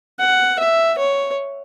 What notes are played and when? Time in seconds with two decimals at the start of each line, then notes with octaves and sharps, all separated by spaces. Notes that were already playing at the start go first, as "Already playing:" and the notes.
0.20 F#5
0.59 E5
0.98 C#5